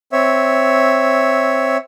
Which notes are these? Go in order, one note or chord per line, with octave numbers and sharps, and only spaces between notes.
C4 C#5 E5